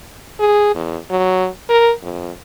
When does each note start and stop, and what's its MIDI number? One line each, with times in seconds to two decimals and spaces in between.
0.40 0.72 68
0.75 0.97 40
1.10 1.48 54
1.69 1.92 70
2.02 2.31 41